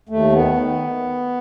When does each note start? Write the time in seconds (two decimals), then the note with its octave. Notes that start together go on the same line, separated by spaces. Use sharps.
0.09 D#2 A3
0.32 D#3 B3
0.56 D#3